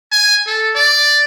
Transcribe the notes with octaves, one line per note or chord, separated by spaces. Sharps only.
G#5
A4
D5